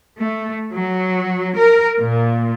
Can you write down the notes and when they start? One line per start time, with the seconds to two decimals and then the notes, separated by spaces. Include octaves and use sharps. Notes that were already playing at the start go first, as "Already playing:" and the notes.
0.18 A3
0.74 F#3
1.58 A#4
1.99 A#2